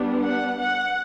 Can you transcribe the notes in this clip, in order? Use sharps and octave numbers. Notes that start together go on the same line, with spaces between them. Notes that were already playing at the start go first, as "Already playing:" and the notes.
Already playing: G3 B3 D4
F#5
F#5